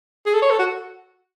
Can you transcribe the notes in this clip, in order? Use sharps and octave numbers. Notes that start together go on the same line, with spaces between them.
G#4
A4
C#5
A4
F#4